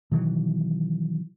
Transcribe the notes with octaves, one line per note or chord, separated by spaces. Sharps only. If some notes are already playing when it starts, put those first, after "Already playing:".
B2 D#3 E3 F#3